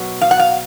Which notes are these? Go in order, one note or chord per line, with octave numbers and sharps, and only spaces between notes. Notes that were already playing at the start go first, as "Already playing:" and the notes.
Already playing: B2 F#3
F5
F#5
F5